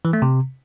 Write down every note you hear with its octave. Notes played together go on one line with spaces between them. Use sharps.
E3
A3
C3